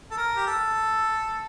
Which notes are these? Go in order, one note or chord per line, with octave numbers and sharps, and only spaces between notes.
A4
A#4
G4
A4